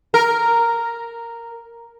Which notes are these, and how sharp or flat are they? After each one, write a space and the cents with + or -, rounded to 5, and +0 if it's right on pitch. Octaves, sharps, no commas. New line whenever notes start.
A#4 -5